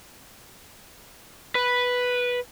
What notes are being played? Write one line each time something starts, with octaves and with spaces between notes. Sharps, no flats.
B4